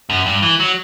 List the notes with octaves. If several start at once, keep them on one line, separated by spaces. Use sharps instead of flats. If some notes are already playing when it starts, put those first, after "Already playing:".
F#2
G2
E3
F#3